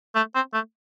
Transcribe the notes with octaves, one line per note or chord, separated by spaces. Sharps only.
A3
C4
A3